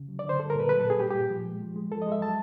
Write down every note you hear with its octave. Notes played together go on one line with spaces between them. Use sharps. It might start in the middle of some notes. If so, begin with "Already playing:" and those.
Already playing: C#3
F#3
D5
D3
C5
G3 A4
A#4
A#2 B4
F#3 B4
A4
A#2
G#4
G3 G4
G4
A#2
F3
G#3
F3
G#3
F3 A4
D#5
G#3
E5
F#3 A5